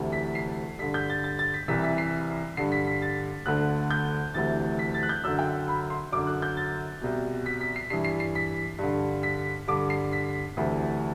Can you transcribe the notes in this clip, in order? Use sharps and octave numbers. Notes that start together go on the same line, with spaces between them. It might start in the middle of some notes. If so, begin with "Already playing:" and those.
Already playing: D2 C3 E3
B6
C7
G2 D3 B6
G6
A6
A6
A6
B6
C2 C3 E3 B6
B6
C7
G2 D3 C7
B6
B6
A6
D2 D3 F#6
G6
D2 C3 E3 A6
B6
A6
F#6
G6
F#2 D3 E6
G5
B5
C6
F#2 D3 D6
F#6
G6
A6
C2 B2
B6
B6
C7
G2 E3 C7
C7
C7
B6
G2 D3
B6
G2 D3 D6
C7
B6
D2 C3 E3